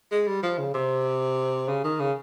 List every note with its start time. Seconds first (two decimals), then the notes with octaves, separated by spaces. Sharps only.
0.11 G#3
0.27 G3
0.43 F3
0.58 C#3
0.74 C3
1.68 C#3
1.84 D#3
2.00 C#3